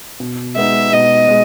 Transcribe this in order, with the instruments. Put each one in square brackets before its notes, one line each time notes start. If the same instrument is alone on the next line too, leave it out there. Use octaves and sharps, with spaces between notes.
[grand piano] B2
[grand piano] G#3 B3 D#4 [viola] E5
[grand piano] B2 [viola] D#5
[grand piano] G#3